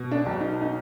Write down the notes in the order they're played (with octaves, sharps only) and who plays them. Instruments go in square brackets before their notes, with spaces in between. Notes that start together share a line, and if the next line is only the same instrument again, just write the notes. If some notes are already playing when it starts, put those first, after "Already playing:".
Already playing: [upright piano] B2
D4
B1
D#4
D#4